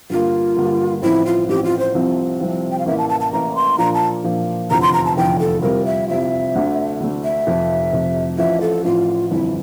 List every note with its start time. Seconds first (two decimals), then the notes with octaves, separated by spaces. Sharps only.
0.10 G2 D3 G3 A#3 F4
0.56 G2 D3 G3 A#3
1.02 A1 A2 F3 C4 E4
1.26 F4
1.48 A1 A2 F3 C4 G4
1.64 F4
1.79 C5
1.94 C2 C3 F3 C4
2.40 C2 C3 F3 C4
2.71 G5
2.79 F5
2.86 A1 A2 E3 A#3 E5
2.98 A5
3.09 A5
3.20 A5
3.33 A1 A2 E3 A#3 A#5
3.55 C6
3.78 A#2 F3 A#3 D4 A#5
3.94 A5
4.24 A#2 F3 A#3 D4
4.70 F1 E2 D3 F3 A#5
4.82 C6
4.93 A#5
5.06 A5
5.17 F1 E2 D3 F3 G5
5.39 A4
5.62 C2 C3 G3 C4 F4 A#4
5.85 E5
6.08 C2 C3 G3 C4 F4 E5
6.55 D2 D3 A3 D4
7.00 D2 D3 A3 D4
7.24 E5
7.47 F1 F2 C3 F3
7.92 F1 F2 C3 F3
8.38 A1 A2 F3 E5
8.61 A4
8.84 A1 A2 F3 F4
9.31 G1 F2 E3 E4